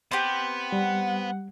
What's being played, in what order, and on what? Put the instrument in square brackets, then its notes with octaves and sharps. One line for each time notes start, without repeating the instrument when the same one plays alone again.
[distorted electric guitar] B3 [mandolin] C4 G4
[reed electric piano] G3 [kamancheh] F#5